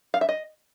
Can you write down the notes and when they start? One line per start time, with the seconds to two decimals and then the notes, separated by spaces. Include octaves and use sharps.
0.14 F5
0.21 E5
0.29 D#5